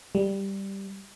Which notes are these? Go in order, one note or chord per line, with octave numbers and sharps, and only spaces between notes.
G3